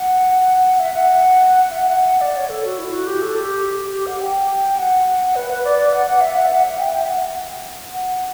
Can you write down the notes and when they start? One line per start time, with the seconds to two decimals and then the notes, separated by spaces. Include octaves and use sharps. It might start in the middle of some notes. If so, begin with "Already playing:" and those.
Already playing: F#5
0.79 E5
0.93 F#5
1.64 F#5
1.71 E5
1.79 F#5
2.21 D5
2.36 C#5
2.49 A4
2.65 F#4
2.78 E4
2.93 F#4
3.07 G4
3.22 A4
3.35 G4
3.93 G4
4.07 F#5
4.21 G5
4.78 F#5
5.36 B4
5.50 B4
5.64 D5
5.78 D5
5.93 F#5
6.06 F#5
6.21 E5
6.36 F#5
6.50 F#5
6.64 E5
6.78 G5
6.93 G5
7.01 E5
7.07 F#5
7.93 F#5